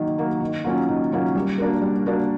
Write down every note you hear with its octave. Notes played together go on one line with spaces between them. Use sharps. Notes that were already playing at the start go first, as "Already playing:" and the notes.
Already playing: D#3 F#3 A#3
F#3 A#3
D#3
F#3 A#3 C#4 F4
D#3
F#3 A#3 C#4 F4
G3
A#3 D4 F#4 A#4
G3
A#3 D4 F#4 A#4